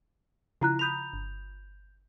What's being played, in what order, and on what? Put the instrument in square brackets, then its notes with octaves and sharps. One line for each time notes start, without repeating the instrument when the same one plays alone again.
[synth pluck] C#3 F3 F4 [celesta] E4 A#5 F#6
[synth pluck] A#5 B5 D#6 [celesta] G6 F7
[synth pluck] G1